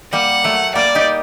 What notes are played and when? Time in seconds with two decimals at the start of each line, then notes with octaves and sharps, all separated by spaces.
0.13 G3 A#3 F#5
0.44 F#3 A3
0.74 G3 A#3 D5
0.95 D#4 G4